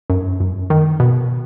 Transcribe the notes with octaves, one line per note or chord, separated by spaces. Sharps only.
F#2
F#2
D#3
B2